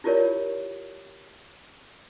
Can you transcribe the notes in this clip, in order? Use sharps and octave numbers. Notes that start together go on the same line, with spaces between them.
E4 F4 G4 A#4 C#5 D5